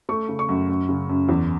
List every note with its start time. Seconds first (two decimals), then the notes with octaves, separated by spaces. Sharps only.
0.09 A3 C#6
0.29 C#3
0.39 C#6
0.49 F#2
0.69 F#2
0.89 C#3
1.09 F#2
1.29 E2